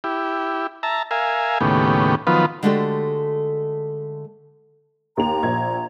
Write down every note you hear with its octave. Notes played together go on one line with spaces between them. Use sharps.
E4 G4
E5 A5 A#5
A#4 E5 F5 G#5
D#2 A2 C#3 B3 G4
D#3 F3 F#3 B3 F4 B4
D3 G#3 A3 F#4 G4 A4
D#2 A#5 F7
A#1 G#6